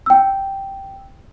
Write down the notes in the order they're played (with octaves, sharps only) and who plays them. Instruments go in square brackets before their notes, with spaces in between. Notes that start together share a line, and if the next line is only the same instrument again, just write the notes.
[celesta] G5 E6